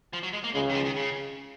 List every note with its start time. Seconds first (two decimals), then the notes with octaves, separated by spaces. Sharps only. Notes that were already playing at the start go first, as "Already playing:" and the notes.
0.13 F3
0.23 F#3
0.33 G#3
0.44 A#3
0.54 C#2 C#3 G#3
0.69 D#3
0.75 F3
0.85 D#3
0.96 C#3